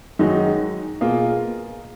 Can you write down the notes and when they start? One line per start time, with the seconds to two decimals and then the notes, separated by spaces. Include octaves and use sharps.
0.19 F#2 D#3 G#3 D#4 F#4
1.01 B2 A#3 F4 G#4